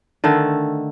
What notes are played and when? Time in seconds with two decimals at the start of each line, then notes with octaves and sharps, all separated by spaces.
0.24 D3 D#3 A3